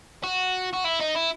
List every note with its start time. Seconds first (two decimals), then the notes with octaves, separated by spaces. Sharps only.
0.24 F#4
0.73 F#4
0.84 E4
1.00 D#4
1.15 E4